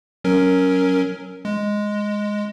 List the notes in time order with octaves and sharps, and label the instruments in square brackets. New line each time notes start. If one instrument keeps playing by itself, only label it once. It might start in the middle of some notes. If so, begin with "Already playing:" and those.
[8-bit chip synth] F#3 C#4 A#4
G#3